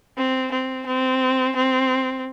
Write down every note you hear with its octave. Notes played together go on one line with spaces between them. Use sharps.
C4
C4
C4
C4